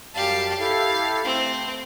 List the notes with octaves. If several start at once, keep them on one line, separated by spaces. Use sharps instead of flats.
F#2 G3 G4 F5 A5
E4 G4 A4 F5
A3 C4